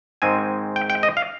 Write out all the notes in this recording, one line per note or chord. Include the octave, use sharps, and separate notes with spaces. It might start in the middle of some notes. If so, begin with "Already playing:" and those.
G#2 D#3 G#3 C4 G#5
G5
G5
D#5
F5